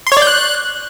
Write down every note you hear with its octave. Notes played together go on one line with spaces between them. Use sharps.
C6
C#5
D5
G6
F#6